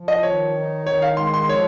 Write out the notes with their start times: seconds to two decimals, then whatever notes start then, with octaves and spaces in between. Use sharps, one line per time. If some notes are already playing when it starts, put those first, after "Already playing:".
Already playing: F3
0.08 D#5
0.23 D#3 C#5
0.55 D#4
0.87 D#3 C#5
1.02 F5
1.17 G#3 C6
1.34 C6
1.49 F3 C#5